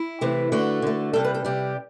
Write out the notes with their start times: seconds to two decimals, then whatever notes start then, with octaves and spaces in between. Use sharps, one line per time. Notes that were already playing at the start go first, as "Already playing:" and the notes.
Already playing: E4
0.21 C3 E3 A3
0.52 D3 A3 F#4
0.82 D3 A3
1.13 C3 G3 A4
1.24 B4
1.34 A4
1.45 C3 G3 G4